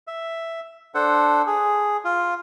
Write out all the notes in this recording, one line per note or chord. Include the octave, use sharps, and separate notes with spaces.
E5
D4 A4 C5 F#5
G#4
F4